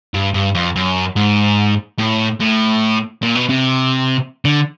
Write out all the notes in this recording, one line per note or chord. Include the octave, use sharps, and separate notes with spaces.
G2
G2
F2
F#2
G#2
A2
A2
A#2
B2
C3
D3